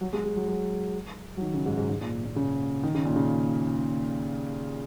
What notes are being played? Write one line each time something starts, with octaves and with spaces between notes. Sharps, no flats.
F#3
G#3
G#3
F#3
F#3
F#3
D#3
C#3
G#2
G#2
G#2
A#2
A#2
C#3
D#3
C#3
A#2
C#3